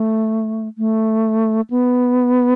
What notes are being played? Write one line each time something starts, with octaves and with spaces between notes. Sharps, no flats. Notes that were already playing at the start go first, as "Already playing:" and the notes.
Already playing: A3
A3
B3